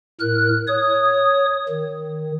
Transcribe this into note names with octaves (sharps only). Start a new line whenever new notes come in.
A2 A#4 F#6
C#5 D#6
D#3